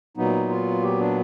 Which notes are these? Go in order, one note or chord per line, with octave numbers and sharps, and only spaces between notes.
A#2 F#3 B3 D#4
F4
G4
D4